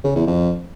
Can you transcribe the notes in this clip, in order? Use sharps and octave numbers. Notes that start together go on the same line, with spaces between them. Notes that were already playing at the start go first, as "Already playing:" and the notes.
C#3
E2
F2